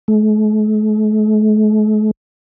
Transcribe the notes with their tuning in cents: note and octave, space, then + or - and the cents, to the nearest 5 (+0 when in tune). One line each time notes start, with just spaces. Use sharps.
A3 -45